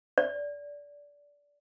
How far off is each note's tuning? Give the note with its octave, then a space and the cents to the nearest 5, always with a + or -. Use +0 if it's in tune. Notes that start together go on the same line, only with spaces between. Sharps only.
D5 -20